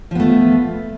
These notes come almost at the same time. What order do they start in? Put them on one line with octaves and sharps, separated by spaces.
F3 B3 A3